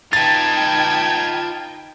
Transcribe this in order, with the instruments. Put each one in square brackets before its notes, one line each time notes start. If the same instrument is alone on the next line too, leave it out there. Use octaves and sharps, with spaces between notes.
[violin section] D#4 G5 [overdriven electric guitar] F4 B4 [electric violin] A5 G#6 [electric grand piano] A6